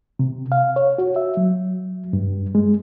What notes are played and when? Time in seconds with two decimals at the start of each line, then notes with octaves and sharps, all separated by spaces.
0.19 C3
0.52 F5
0.76 C#5
0.98 F#4
1.16 E5
1.37 F#3
2.13 G2
2.55 G#3